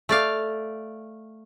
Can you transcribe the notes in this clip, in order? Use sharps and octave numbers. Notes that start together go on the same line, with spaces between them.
A3 D5 F5